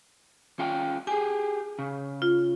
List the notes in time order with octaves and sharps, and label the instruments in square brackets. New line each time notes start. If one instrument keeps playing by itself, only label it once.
[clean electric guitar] C#4 F4 G5
[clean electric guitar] G4 G#4 [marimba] G#5
[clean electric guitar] C#3
[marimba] F4